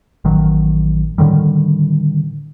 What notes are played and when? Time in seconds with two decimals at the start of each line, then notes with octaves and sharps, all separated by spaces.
0.25 A1 D#3 F#3
1.18 A2 D3 D#3 G3